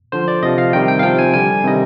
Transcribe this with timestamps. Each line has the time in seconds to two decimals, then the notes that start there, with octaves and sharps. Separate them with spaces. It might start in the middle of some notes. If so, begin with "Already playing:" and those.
0.12 D3 F3 C5
0.28 D5
0.43 C3 F3 D#5
0.58 F5
0.73 C3 D#3 G3 G5
0.88 G5
0.99 F5
1.03 C3 F3 G5
1.19 G#5
1.33 D3 G3 G#5
1.64 C3 D#3 G3 D#5